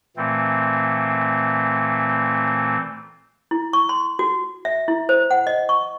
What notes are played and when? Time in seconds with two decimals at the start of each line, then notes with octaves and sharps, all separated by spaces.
0.17 A#2 E3 A3 C4
3.51 E4
3.73 C#6
3.89 C6
4.19 F#4
4.65 E5
4.88 E4
5.09 C5
5.31 F#5
5.47 D#5
5.69 C#6